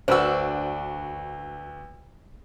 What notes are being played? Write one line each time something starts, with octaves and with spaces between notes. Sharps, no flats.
D2 D4 F#4 B4 C5 E6